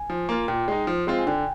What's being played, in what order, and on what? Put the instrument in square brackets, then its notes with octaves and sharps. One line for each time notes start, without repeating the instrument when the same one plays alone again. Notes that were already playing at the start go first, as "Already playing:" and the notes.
Already playing: [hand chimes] G#5
[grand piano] F3
A#3 F4
[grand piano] A#2 [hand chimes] G5
[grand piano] G#3 D#4
F3
G#3 C4 F4
[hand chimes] G#5
[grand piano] D3 [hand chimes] G5